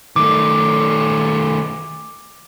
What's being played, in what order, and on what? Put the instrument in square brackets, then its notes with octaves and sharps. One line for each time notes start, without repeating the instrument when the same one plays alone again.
[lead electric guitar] D#3 A3 [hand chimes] D6